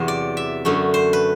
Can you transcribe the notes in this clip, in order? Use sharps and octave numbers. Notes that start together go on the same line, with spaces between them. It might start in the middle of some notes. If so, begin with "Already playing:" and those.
Already playing: E2 C3 F#3 C5
D5
E5
F#2 D3 F#3 A3
C5
B4